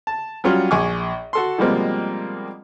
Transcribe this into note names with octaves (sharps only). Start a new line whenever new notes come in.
A5
F#3 G3 C#4 F4 F#4
A#1 G#5 C#6 D6
F#4 A4 C6
B2 F3 G3 G#3 A#3 C4